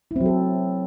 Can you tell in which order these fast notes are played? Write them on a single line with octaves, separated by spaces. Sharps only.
E4 C4 F#3 A4